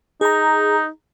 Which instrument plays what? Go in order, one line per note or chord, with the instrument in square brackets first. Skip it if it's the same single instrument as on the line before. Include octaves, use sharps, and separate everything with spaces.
[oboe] D#4 [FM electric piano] G#4 A#5